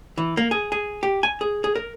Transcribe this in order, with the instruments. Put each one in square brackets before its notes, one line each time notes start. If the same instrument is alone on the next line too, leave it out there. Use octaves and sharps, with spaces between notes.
[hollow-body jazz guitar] E3
A#3
G#4
G#4
G4
G#5
G#4
G#4
A#4